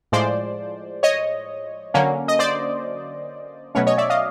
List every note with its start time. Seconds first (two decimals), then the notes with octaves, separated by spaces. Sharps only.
0.12 A2 F3 G#3 C5 D5
1.03 C#5 D#5
1.94 D3 F#3 A#3 C#4
2.28 D#5
2.39 C5 D5
3.75 B2 F#3 A3 C#4 B4 C#5
3.86 C#5 D#5
3.98 D5 E5
4.10 D#5 F5